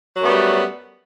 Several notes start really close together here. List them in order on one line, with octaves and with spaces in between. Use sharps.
F#3 F#2 A3 B3 G3